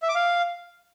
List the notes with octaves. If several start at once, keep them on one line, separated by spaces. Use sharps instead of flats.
E5
D6
F5